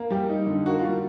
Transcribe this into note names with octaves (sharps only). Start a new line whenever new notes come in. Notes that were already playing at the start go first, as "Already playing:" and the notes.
Already playing: A#3
G3 G4
D#4
D3
A#3 F#4
G3 F4